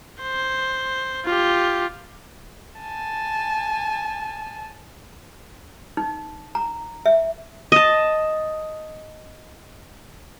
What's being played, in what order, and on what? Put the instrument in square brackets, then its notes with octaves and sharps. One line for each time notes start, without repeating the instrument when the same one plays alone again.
[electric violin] C5
F4 G4
[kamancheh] G#5 A5
[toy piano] D#4
A#5
E5
[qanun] D#5 A5